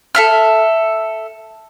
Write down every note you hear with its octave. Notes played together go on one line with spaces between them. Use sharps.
A4 E5 F6